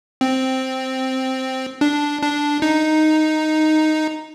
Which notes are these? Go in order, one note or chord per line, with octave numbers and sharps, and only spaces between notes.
C4
D4
D4
D#4